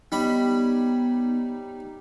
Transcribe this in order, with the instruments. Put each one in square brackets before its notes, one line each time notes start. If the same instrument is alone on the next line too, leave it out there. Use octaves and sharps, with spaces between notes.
[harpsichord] G3 C#5 B5 [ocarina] B3 [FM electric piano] D#4